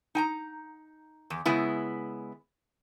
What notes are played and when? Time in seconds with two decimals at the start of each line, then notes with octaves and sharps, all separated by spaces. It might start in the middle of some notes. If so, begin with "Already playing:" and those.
0.15 D#4 G5 A#5
1.30 E2
1.45 C#3 G#3 B3 E4